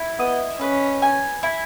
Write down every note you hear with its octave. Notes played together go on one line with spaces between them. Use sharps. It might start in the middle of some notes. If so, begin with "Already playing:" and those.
Already playing: E4
B3 D#5
C#4 B4
G#5
E4